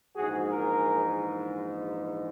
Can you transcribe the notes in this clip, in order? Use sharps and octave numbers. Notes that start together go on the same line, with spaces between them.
A#1 G#2 E3 F#4 G#4
G#4 A#4